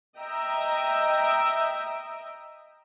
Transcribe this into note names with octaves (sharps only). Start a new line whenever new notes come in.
D#5 E5 G5 A#5